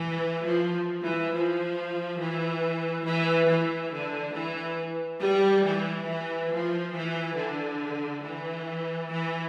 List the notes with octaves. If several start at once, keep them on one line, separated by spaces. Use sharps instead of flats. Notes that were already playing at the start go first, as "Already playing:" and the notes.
Already playing: E3
F3
E3
F3
E3
E3
E3
D3
E3
G3
E3
E3
F3
E3
D3
E3
E3